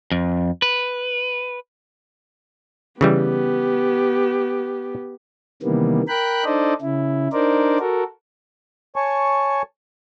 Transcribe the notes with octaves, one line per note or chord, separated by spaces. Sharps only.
F2
B4
C#3 E3 G3 B3 G4
C3 D#3 E3 G3 A#3 B3
A#4 G5 B5 F#6
D4 D#4 A4 C5 D5 D#5
C#3 E4
D4 D#4 A#4 C5 D5
F#4 A4 A#4
C#5 G#5 A5 C#6